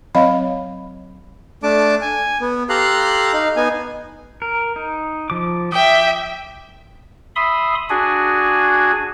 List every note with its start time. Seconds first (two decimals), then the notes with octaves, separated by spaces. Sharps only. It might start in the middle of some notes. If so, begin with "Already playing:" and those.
0.15 F#3 C4 C#5 D#5 F5 B5
1.63 A3 D4 A5 D6
2.01 G#5
2.41 B3
2.69 G4 A4 F5 A#5 C6 F#6
3.33 D#4 F5
3.57 B3 D#4 G#5
4.42 A#4
4.76 D#4
5.30 F3 D6
5.72 E5 G5 D6 D#6
7.36 E5 B5 C6 D#6
7.90 D4 F#4 G#4 G#5